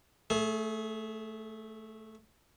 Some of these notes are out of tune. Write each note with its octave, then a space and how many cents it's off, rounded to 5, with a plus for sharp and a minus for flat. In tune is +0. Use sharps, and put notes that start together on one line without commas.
A3 +0 G#4 +35